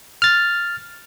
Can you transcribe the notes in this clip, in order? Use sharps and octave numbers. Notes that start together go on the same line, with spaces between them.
F6 A6